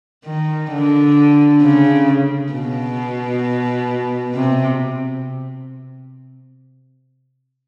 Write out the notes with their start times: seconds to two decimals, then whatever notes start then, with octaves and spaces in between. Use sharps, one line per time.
0.25 D#3
0.72 D3
1.61 C#3
2.52 B2
4.34 C3